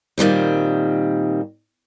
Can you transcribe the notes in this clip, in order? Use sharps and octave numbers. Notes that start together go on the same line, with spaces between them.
A#2 D#3 G3 C4